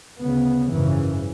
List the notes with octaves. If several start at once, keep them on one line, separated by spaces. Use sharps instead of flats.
D2 C#3 B3
G#1 F#2 C#3 E3